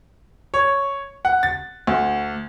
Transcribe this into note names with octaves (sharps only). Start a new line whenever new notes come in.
C#5
F#5
A6
D2